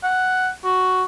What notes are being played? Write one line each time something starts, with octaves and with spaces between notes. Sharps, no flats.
F#5
F#4